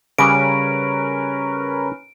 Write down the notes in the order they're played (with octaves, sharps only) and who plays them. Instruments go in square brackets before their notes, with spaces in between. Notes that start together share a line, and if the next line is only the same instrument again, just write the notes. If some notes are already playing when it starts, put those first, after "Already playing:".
[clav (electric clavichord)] C#3 G3 [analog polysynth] C#4 A#4 B4 [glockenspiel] D7